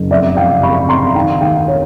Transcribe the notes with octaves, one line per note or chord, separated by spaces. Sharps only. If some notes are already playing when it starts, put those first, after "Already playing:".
Already playing: F#1
F1 D5 E5
F1 F5 G5
C3 B5 C#6
C3 A#5 C6
D#3 F5 G5
D#2 F5 G5
C#5